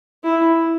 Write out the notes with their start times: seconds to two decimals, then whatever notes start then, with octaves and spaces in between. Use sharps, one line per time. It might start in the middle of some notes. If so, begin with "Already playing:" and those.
0.24 E4